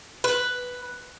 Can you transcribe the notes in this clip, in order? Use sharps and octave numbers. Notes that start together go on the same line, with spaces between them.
B4